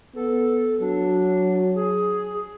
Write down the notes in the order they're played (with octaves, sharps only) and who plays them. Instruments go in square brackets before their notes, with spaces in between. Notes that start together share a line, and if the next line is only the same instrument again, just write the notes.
[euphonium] B3 [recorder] A4
[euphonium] F#3 [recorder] D4
[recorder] G#4